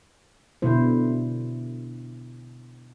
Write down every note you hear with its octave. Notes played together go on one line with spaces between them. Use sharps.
B2 D3 E4 C5